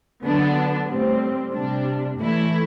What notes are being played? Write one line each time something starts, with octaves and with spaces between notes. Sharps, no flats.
D3 F#3 B3 D4
A2 G3 C4
C3 G3 D4
A2 E3 A3 E4